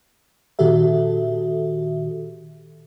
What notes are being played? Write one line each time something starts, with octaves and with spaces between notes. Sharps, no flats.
A#2 D#3 F#4 G4 A4 E5